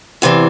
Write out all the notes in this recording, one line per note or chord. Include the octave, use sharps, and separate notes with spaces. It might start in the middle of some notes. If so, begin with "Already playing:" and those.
E2 C3 E3